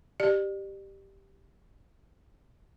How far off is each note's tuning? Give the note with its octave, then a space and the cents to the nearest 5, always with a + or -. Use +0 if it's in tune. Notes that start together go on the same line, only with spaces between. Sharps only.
G4 +0 D5 +35